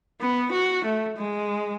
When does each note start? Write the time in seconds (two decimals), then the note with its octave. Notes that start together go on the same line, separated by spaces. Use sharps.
0.21 B3
0.52 F#4
0.85 A3
1.17 G#3